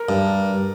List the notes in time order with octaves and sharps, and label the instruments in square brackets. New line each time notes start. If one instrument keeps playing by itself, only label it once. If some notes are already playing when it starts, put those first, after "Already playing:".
Already playing: [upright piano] A#4
[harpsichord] G2